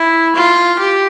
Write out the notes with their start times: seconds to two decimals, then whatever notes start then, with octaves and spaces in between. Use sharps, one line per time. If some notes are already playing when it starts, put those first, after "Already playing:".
Already playing: E4
0.35 F4
0.79 G4